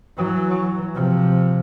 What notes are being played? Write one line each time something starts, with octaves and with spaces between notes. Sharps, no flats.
E3 F#3
C3 F3